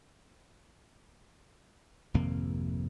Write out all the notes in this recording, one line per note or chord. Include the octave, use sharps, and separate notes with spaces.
G#1 F2 C3 A#3